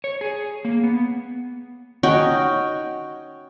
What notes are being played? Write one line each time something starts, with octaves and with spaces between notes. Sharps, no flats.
C#5
G#4
A#3
B3
C#4 D#4 F#4 G5